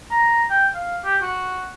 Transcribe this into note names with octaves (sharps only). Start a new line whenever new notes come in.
A#5
G5
F5
G4
F#4